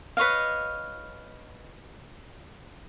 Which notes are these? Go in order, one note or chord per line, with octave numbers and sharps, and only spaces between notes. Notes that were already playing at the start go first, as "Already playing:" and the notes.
B4 C#5 D#5 F5